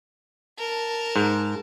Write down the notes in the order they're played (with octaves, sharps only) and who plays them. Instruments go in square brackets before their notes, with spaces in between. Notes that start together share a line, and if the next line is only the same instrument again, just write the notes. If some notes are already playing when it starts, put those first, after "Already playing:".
[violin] A#4 A5
[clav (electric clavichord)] G#2